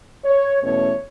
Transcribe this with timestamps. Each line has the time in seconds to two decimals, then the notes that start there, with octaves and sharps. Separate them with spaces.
0.24 C#5
0.62 E2 B2 A3 C#4 C#5